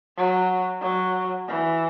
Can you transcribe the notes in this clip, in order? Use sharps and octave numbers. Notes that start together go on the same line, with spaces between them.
F#3
F#3
E3